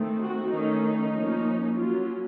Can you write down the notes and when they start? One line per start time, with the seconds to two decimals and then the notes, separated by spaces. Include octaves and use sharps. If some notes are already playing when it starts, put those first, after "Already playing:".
Already playing: D#3 A3 C4
0.21 F#4
0.52 D#3 A3 C#4 D#4
0.83 D#4
1.14 F3 A#3 C#4
1.77 F#3 A#3 C#4 F4